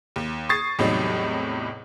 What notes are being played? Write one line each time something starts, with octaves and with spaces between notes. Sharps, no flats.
D#2
C#6 D#6 G#6 A6 C7
E2 A2 C3 F#3 G3 D#4